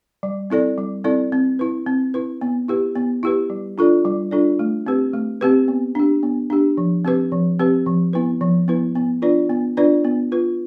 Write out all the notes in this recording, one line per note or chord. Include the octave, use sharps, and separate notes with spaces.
G3
C4 E4 A4 D5
G3
C4 E4 A4 D5
C4
E4 B4
C4
E4 B4
B3
E4 G4 B4
B3
E4 G4 B4
G3
D4 F4 A4 D5
G3
D4 F4 A4 D5
A3
C4 G4 B4
A3
C4 G4 B4
B3
D4 G4
B3
D4 G4
F3
C4 G4 B4
F3
C4 G4 B4
F3
B3 E4 B4
F3
B3 E4 B4
B3
D4 F4 B4 D5
B3
D4 F4 B4 D5
B3
F4 B4